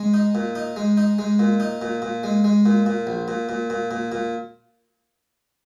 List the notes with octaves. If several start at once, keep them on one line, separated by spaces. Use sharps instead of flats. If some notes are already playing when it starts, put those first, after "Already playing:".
Already playing: G#3
D#4
A#2
D#4
G#3
D#4
G#3
A#2
D#4
A#2
A#2
G#3
G#3
A#2
A#2
A#1
A#2
A#2
A#2
A#2
A#2